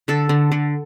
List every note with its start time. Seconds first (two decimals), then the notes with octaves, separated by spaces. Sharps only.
0.08 D3 A4
0.29 D3
0.52 D3